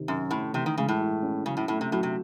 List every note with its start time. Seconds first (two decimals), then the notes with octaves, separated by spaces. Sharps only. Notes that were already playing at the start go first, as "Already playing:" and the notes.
Already playing: C3 D#3
0.08 F#2 C#4
0.30 A2 A3
0.54 C3 E3
0.66 D#3
0.78 C#3 G#3
0.89 A2
1.00 E4
1.23 C#4
1.46 C#3 F#3
1.57 A2
1.68 A2 A3
1.81 C3
1.92 A2 F#3
2.03 C3